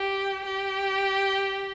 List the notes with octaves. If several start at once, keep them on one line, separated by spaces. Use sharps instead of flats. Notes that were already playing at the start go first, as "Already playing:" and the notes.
Already playing: G4
G4